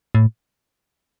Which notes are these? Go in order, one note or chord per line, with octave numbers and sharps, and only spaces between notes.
A2